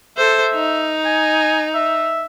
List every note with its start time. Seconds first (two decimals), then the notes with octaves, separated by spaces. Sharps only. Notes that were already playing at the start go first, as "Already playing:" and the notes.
0.18 A4 C5 E5
0.54 D#4
1.05 G#5
1.75 E5